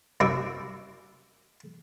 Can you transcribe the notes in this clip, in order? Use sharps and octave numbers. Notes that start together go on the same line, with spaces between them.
F#2 C3 D#4 E4 E5 D6